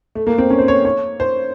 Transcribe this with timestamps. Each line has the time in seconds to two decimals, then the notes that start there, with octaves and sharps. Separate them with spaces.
0.15 A3
0.27 A#3
0.38 C4
0.50 C#4
0.58 C5
0.68 C#5
0.85 C#5
1.20 C5